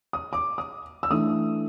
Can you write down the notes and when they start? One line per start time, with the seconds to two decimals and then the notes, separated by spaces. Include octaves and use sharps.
0.13 D#6
0.33 D6
0.58 D#6
1.03 E6
1.11 E3 A3 D4 D#6